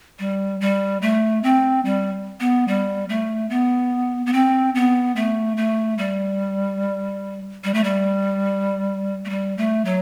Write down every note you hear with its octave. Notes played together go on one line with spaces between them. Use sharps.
G3
G3
A3
C4
G3
B3
G3
A3
B3
B3
C4
B3
A3
A3
G3
G3
A3
G3
A3
G3
A3
F#3